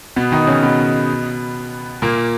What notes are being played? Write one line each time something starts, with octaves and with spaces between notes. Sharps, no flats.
B2 B3
D#3 D#4
C#3 C#4
B2 B3
A#2 A#3